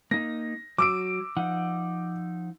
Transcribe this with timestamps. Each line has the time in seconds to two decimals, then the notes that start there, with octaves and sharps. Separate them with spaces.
0.11 A#3 D#4 A#6
0.78 F#3 D6 E6 D7
1.37 F3 D#4 F#5